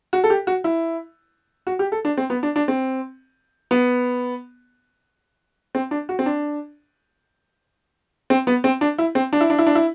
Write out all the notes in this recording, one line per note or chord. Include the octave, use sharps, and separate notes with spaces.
F#4
A4
G4
F#4
E4
F#4
G4
A4
D4
C4
B3
D4
D4
C4
B3
C4
D4
F#4
C4
D4
C4
B3
C4
D4
E4
C4
D4
E4
D4
E4
D4
E4